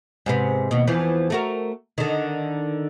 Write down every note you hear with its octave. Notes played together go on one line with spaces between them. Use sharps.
G#2 C3 B3
D#2 B2
E2 E3 F3
A3 F#4 A#4
D3 D#3